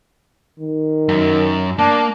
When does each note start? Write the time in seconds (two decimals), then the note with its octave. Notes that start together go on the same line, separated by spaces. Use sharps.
0.59 D#3
1.09 F#2
1.79 A#3 D4 A5